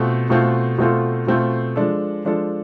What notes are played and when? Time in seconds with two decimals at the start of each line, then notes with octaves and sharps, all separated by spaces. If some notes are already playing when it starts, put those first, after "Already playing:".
Already playing: B2 A3 C4 F4 A4
0.30 B2 A3 C4 F4 A4
0.78 B2 A3 C4 F4 A4
1.27 B2 A3 C4 F4 A4
1.76 F3 G#3 D4 A4
2.25 F3 G#3 D4 A4